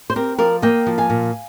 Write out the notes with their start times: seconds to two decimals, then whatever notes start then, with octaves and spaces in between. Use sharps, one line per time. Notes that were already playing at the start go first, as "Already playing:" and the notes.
0.10 C5
0.16 C4 G4 A#4
0.38 F3 A#4 D5
0.62 A#3 D#5 G5
0.87 F3
0.98 F5 G#5
1.10 A#2